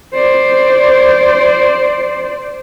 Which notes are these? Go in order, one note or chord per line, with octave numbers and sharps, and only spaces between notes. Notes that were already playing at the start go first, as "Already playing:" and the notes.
C5 D5